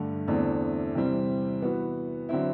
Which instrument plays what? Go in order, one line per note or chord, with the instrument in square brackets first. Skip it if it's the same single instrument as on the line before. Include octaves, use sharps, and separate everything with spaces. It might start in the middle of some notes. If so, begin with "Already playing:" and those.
Already playing: [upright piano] G2 D3 A3
E2 D3 A3 C4
C3 E3 G3 C4
E3 B3 F#4
D3 F#3 C4 E4